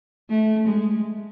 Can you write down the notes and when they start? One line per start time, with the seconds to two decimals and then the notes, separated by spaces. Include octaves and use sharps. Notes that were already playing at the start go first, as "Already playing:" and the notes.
0.30 A3
0.68 G#3